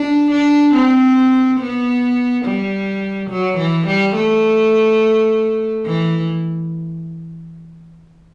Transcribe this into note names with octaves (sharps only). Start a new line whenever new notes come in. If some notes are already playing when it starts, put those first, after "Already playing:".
Already playing: D4
D4
C4
B3
G3
F#3
E3
G3
A3
E3